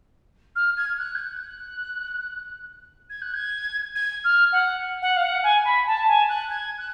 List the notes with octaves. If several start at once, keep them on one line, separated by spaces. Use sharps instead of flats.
F6
G#6
F#6
G#6
F#6
G#6
F#6
G#6
G#6
F6
F#5
F#5
F5
F#5
G#5
B5
A5
G#5
F#6
G#6
F#6